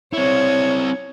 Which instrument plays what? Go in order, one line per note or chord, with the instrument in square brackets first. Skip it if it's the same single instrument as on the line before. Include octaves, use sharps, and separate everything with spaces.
[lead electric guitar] C4 E4 [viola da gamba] C#5